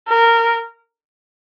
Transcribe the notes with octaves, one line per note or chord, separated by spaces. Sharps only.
A#4